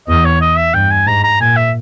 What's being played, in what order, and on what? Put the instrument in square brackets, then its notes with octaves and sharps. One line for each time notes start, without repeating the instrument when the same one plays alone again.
[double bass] E2 [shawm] D#5
[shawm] C#5
D#5
E5
[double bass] G2 [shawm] G5
[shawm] G#5
[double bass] G#2 [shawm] A#5
[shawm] A#5
[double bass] A#2 [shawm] G#5
[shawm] E5